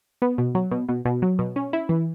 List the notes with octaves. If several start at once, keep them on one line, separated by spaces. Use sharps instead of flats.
B3
B2
F#3
B2
B2
B2
F#3
B2
C#4
E4
E3